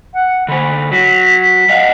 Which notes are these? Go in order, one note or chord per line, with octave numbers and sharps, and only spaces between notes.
F#5
D3 C5 B5
F#3 B6
D#5 F5 F#5